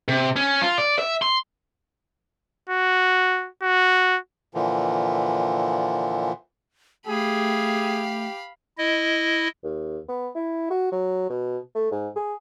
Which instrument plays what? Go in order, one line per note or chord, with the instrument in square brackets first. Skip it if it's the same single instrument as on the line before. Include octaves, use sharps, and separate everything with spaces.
[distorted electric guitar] C3
C#4
F4
D5
E5
C6
[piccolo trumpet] F#4
F#4
[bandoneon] A#2 D3 E3 F3
[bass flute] A3 [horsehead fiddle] G4 [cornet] G#4 [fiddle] F5 B5
[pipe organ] E4 D#5
[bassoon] D#2
B3
E4
F#4
F#3
B2
A3
G#2
G#4